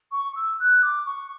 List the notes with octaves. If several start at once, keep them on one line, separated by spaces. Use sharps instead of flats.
C#6
E6
F#6
D6
C#6